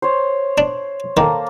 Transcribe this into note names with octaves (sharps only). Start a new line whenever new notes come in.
C5 C#5
D4
D#3 A#3 A4